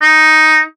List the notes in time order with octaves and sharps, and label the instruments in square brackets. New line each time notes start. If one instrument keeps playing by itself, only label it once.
[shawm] D#4